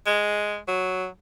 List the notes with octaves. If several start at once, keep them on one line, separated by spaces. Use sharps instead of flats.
G#3
F#3